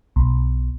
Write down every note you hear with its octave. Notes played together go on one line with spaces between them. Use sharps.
B1